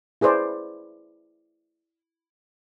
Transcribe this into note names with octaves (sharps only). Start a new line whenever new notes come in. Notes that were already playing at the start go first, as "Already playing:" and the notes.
E4 G#4 B4 C5 D5